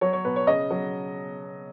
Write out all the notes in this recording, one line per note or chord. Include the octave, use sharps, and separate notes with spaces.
F#3 C#5
C#5
B2 B4
C#5
C#3 D#5
F#3